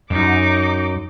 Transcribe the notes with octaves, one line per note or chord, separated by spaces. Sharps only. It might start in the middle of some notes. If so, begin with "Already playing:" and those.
F#2 D#4 D6